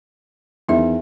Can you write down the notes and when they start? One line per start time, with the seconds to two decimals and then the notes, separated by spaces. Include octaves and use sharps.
0.69 E2 D#3 E4 E5